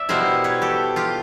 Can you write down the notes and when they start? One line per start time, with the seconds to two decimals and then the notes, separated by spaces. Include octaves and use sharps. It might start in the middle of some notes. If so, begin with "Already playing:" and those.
Already playing: D5 E5
0.09 B2 G3 B3 E4 A#4 C5
0.44 B4 C#5
0.62 G4 A4
0.96 F4 G4